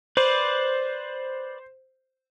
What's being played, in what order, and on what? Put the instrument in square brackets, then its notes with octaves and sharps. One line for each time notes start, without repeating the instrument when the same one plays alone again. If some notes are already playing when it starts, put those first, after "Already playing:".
[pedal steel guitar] B4 D5 [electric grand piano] C5